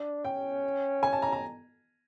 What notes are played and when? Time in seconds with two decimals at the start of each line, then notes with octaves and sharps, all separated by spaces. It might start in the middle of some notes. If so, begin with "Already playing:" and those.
Already playing: D4
0.24 C#4 G5
1.03 G#5
1.13 A5
1.22 A#5
1.32 A#5